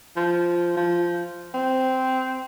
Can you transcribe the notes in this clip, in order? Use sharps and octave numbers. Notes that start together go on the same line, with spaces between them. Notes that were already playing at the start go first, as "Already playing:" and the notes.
F3
F3
C4